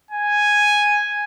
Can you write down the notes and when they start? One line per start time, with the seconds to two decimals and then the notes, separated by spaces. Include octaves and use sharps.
0.10 G#5